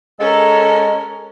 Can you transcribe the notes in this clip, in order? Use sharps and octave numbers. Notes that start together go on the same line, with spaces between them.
G#3 C#4 A4 A#4